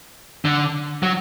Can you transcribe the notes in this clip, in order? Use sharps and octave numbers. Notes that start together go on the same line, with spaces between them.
D3
F#3